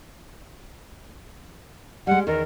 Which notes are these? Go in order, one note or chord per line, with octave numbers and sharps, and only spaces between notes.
G3 G#3 F#5
E2 D#3 A#4